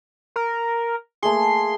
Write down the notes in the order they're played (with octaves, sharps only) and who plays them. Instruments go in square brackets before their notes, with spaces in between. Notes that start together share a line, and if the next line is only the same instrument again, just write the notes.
[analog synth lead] A#4
[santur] A3 A#3 G#4 [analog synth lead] C6